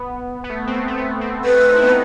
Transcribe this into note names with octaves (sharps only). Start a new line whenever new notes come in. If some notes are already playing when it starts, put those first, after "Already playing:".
Already playing: B3
B3
A3
C4
B3
A3
B3
A3 C4
A3 C4 B4
D#4
E4
B3 D#4